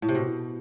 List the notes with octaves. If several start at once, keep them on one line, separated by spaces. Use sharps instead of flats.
A2
C3
B2